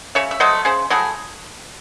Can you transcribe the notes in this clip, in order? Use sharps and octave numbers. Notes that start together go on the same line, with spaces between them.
C#3 C#5 E5
E5
F#3 A3 C5 D#5
C#3 G#4 C5
F#3 A3 E4 G#4